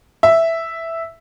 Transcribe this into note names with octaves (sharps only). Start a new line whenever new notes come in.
E5